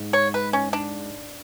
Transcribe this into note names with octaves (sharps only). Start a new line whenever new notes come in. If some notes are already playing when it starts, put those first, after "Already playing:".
Already playing: G#2
C#5
B4
C#4
D4